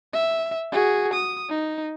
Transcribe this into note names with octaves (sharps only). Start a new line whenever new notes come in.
E5
F#4 G#4
D#6
D#4